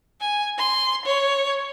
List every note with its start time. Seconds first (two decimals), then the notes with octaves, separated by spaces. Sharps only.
0.21 G#5
0.58 C6
1.06 C#5